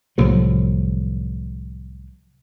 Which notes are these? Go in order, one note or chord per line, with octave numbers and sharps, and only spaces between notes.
C2 A2 F3 F#3